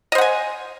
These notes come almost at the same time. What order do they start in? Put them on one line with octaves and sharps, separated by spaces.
D#5 C5 F#5 G#5